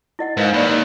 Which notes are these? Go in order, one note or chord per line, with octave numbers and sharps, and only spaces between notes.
E4 D#5 F#5
G#2 A#4 B4 F5
D#2 D5 B5